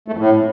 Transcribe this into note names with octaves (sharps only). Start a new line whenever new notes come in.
A3
F2
A2